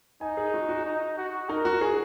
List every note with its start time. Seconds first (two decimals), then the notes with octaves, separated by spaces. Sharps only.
0.21 D#4 G#5
0.37 G#4
0.54 F#4
0.69 F#4
0.85 D#4
1.18 F#4
1.49 D#4 A#4
1.65 F#4
1.81 G#4